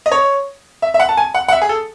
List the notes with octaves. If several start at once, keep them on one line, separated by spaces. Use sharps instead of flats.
D#5
C#5
E5
E5
F#5
A5
G#5
F#5
F#5
E5
G#4
A4